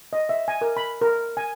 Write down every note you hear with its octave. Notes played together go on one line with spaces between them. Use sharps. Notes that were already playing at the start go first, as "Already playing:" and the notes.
D#5
E5
G#5
A#4
B5
A#4
G#5